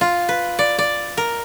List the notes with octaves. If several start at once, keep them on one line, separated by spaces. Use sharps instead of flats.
F4
B4
D5
D5
A#4